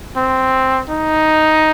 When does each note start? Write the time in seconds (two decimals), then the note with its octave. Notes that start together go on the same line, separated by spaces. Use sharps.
0.16 C4
0.89 D#4